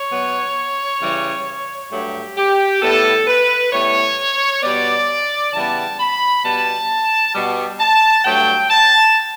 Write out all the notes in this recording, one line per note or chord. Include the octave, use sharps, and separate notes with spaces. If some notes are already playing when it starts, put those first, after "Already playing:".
Already playing: C#5
B2 F#3 B3
C#3 E3 G3
G2 F#3 A3 G4
G4
A2 G3 B3 A4
B4
A2 G3 B3 C#5
B2 G3 B3 D5
C#3 E3 G3 B3 A5
B5
B2 G3 B3 A5
B2 G3 B3
A5
G2 F#3 A3 G5
A5